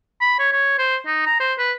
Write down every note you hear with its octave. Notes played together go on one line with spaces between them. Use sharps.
B5
C#5
C#5
C5
D#4
A#5
C5
B4